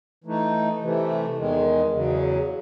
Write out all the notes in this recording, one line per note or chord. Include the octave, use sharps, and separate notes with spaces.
E3 A3 D#4
C3 E3 A3
E2 D#3 G#3
E2 C#3 F#3